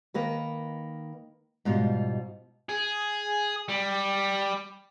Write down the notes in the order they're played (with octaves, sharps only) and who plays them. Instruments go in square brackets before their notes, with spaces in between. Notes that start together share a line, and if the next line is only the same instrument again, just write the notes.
[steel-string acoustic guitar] D#3 A#3 B4
G#2 B2 G3 F4
[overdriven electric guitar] G#4
G3